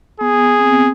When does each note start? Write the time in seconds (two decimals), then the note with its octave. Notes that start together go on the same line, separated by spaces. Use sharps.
0.20 B3 G#4
0.34 B3
0.47 B3
0.59 C4
0.72 B3